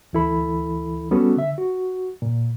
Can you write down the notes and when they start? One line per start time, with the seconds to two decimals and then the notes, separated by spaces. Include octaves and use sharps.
0.13 D2 E3 E4 A4 B5
1.11 G3 B3 C#4 F#4 A4
1.37 D3 E5
1.58 F#4
2.22 A#2